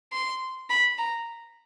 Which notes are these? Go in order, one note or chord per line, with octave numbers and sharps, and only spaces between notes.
C6
B5
A#5